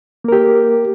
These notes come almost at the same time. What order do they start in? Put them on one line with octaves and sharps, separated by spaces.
A#3 A#4 G4